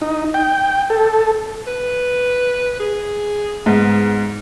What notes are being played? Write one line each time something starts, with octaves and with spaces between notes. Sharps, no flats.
D#4
G5
A4
B4
G#4
G#2 B3